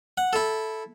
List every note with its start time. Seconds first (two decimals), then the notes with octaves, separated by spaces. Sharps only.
0.18 F#5
0.33 E4 A4